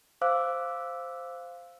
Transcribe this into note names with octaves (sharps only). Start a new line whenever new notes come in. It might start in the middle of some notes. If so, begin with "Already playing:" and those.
C5 F5 D6 E6 F#6